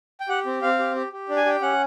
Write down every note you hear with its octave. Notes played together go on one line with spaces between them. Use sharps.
G5
G4 F#5
C4
C4 F5
G4
G4
G4
D4
G#5
G4 G5
C#4 F#5